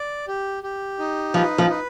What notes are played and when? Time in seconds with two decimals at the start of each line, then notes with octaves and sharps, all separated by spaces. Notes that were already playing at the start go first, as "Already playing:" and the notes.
Already playing: D5
0.28 G4
0.63 G4
0.99 D#4
1.34 F3 B4
1.58 F3
1.70 B4